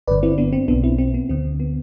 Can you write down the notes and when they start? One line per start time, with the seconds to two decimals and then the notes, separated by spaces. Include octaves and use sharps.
0.08 G1 G2 D3 B4 D5
0.23 C4 E4
0.38 B3 D4
0.53 C4
0.68 B1 B2 B3 D4
0.84 C4 E4
0.98 C4
1.14 B3
1.29 D2 D3 C4
1.60 B3